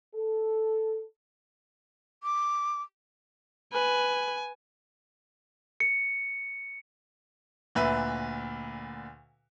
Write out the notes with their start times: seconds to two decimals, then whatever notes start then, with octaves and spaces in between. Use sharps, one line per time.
0.15 A4
2.23 D6
3.73 B4 G#5
5.80 C#7
7.75 D2 A#2 B4 E5